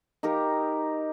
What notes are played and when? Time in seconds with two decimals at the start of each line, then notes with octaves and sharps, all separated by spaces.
0.23 D#4 G4 A#4